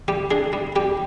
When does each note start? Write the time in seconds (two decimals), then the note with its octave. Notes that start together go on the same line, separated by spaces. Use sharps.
0.08 G3 G4
0.31 D4 G#4
0.53 G3
0.76 G3 G4